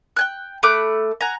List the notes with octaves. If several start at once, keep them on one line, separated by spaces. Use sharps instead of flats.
G5 G#5 F#6
A3 B5 D6 F#6
F#5 G#5 A#5